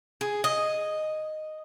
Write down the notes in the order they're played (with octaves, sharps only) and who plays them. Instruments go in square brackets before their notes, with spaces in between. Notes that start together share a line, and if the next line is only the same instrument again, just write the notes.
[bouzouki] G#4
D#5